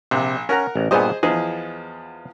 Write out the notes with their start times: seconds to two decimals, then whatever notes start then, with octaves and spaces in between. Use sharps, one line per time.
0.11 A#1 C3
0.49 C#4 A#4 F#5 A#5
0.76 A1
0.91 G2 A#2 B3 G#4 C5 D#5
1.23 E2 F3 B3 G#4 D#5